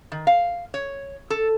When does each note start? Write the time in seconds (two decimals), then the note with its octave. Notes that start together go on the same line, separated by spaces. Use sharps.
0.12 D#3
0.27 F5
0.74 C#5
1.30 A4